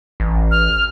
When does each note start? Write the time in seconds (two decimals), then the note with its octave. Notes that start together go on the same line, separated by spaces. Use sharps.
0.20 A1
0.51 F6